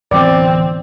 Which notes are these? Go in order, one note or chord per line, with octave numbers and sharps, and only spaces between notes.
D1 E3 B3 C4 D5